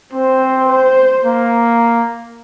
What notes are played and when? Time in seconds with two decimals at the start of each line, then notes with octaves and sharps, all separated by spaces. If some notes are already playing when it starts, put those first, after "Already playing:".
0.13 C4 C5
0.69 C5
1.25 A#3